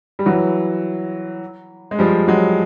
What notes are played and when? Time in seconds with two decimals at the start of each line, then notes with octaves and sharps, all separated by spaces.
0.19 G3
0.26 E3 F#3
1.91 G#3
1.99 F3 G3
2.28 F#3 G#3